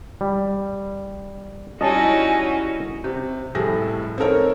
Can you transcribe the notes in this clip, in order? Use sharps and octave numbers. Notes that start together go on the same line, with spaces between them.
G3
G3 C#4 D#4 E4 F#4 D#5 G#5 A5
C3
F1 A2 G3 G#4 A4 A#6
C4 D#4 A4 A#4 C#5